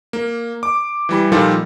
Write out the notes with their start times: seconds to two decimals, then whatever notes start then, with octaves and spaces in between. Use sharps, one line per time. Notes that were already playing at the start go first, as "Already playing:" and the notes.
0.13 A#3
0.63 D6
1.09 E3 G3 B5
1.32 A#2 D#3 F3 G3 F4 A4